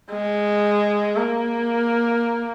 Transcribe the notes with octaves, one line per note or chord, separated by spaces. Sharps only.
G#3
A#3